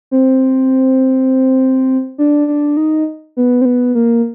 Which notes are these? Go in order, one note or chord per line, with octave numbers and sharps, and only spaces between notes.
C4
D4
D4
D#4
B3
C4
B3
A#3